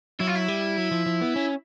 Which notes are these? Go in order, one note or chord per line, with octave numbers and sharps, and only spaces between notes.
F#3 E4
F4
E4
G3
F#3
F3
F3
B3
C#4